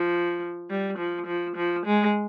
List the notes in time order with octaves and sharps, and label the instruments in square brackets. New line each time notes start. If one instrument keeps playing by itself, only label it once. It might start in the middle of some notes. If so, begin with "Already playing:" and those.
Already playing: [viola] F3
G3
F3
F3
F3
G#3